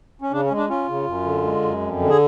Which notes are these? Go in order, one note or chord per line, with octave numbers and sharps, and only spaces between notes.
C#4
C#3 D4
C#4
G#3
D4
C#4 F4
C#3
F#2
D3
G#3
F#2
F2
D3
G#4